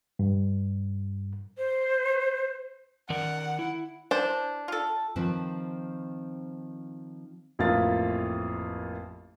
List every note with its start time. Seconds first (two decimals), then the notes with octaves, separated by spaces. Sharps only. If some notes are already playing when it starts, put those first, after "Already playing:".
0.19 G2
1.58 C5
3.10 D#3 A#4 D5 F#5
3.59 E4
4.11 E3 D4 C5
4.68 F4 A4
5.16 D#3 F3 C4 B4 A5
7.59 A1 F2 A#3 E4 F4 A6